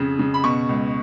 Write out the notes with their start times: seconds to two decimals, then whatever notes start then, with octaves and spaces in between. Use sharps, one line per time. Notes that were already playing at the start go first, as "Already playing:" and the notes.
Already playing: F2 C#3
0.19 C#3
0.34 B5
0.44 B2 C#6
0.69 C#2